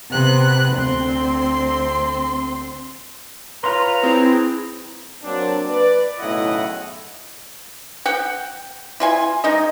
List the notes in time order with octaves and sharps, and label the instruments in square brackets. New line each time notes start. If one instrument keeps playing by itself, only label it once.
[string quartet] C3 B3 F#6
D2 C4 C6
[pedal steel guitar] F4 F5 C6 [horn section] B4 C#5 A#5
[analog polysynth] C4 [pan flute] E4 [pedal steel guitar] G#4
[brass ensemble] F#3 A#3 C4 D4
B4 D5
B1 A2 C#3 E4 D#5 F#5
[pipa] F#5 G5
E4 F4 G#5
G#3 D#4 D#5